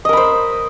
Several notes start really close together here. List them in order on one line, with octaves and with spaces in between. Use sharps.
D#5 A#4 B5 C5